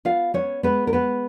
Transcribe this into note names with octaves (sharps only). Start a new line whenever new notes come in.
B3 F4 F5
B3 C#4 C#5
G#3 B3 B4
A#4
G#3 B3 B4